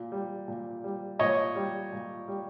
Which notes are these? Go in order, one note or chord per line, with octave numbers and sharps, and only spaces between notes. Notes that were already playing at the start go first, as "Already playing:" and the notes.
Already playing: A#2
G3
A#2
G3
A#2 C#5 D#5
G3
A#2
G3